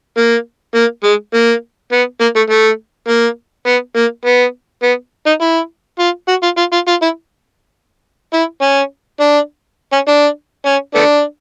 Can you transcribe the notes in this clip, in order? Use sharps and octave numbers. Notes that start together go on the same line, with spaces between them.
A#3
A#3
G#3
A#3
B3
A#3
A3
A3
A#3
B3
A#3
B3
B3
D#4
E4
F4
F#4
F4
F4
F4
F4
E4
E4
C#4
D4
C#4
D4
C#4
A3 B3 D4